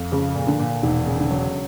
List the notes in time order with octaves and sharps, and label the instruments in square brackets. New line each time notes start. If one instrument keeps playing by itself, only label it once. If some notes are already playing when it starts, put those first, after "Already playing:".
Already playing: [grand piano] F2
[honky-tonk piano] C#3 [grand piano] F3
[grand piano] A#2
[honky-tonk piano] D3
[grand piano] A#2
[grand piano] E1 [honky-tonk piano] D#3
[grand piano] C#3
[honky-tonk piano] D3
[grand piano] F#3